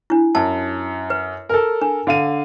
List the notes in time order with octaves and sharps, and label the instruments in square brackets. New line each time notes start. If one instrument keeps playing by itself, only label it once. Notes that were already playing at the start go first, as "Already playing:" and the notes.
[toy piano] D4 E4
[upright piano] F#2 [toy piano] A5
[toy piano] B4
[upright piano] A4 A#4
[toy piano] D4
[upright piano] D3 F5 D#7